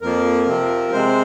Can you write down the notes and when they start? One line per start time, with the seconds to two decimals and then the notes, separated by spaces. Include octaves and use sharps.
0.01 F2 F3 A#3 A#4
0.47 C3 F3 C4
0.93 C3 G#3 C4 C5